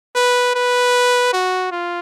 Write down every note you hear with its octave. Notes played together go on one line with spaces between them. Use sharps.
B4
B4
F#4
F4